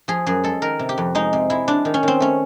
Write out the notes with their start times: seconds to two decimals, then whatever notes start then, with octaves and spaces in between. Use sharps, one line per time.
0.08 F3 G#4
0.27 F#2 G#4
0.44 G#3 A4
0.62 D#3 A#4
0.79 C3
0.89 G4
0.98 F2
1.15 G#3 D#4
1.33 C3
1.50 G#3 E4
1.68 G#3 D4
1.85 D#3
1.94 C#4
2.03 D#3 C4
2.20 A3 C#4